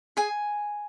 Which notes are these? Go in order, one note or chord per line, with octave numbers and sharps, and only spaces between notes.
G#4 G#5